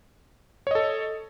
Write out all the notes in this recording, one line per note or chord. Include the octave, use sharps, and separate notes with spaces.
A4 C#5 D#5